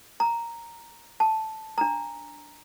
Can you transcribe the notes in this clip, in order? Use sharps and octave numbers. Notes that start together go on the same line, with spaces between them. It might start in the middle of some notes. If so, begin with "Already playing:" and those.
A#5
A5
D4 A#5